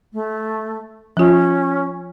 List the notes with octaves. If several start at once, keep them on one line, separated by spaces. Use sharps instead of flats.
A3
F3 C#4 F4